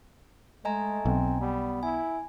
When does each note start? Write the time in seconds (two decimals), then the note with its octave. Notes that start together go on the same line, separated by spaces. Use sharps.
0.65 G#3 A3 D#5 G#5 A#5
1.06 B1 C4
1.40 G3 B3
1.83 E4 G#5